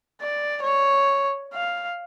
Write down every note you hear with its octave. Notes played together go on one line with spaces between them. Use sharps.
D5
C#5
F5